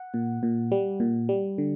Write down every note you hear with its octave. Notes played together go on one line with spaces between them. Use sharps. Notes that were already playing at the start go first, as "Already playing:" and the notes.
Already playing: F#5
A#2
A#2
G3
A#2
G3
D3